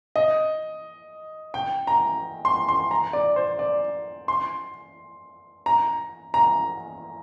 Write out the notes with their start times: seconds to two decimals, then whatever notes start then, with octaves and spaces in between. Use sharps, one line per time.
0.16 D#5
1.54 G5
1.87 A#5
2.45 C6
2.69 C6
2.91 A#5
3.13 D5
3.36 C5
3.59 D5
4.28 C6
5.66 A#5
6.34 A#5